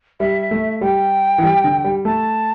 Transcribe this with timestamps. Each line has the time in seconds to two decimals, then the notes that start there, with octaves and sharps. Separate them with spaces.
0.20 G3 E5
0.51 A3
0.81 G3 G5
1.38 E3
1.43 G3
1.64 D3
1.84 G3
2.05 A3 A5